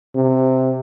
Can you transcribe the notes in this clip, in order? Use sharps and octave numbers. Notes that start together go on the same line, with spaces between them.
C3